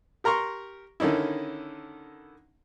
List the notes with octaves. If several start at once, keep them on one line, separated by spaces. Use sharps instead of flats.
G4 A#4 A#5 C6 C#6
D3 D#3 C#4 D#4 E4